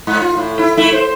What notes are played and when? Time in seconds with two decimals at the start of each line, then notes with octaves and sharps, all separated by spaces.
0.07 G#2
0.22 F4
0.37 A2
0.59 E4
0.77 A3 E4
0.93 C5